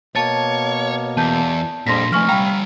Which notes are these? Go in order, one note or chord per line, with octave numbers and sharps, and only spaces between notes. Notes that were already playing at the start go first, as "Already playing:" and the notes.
B2 A#3 C#5 A5 A6
E2 A5 G6
F2 A#2 F3 G3 D4 C6 A#6 B6
E3 F3 A3 G#5 C#6 F6
C3 G3 F5 G5 A#5 B5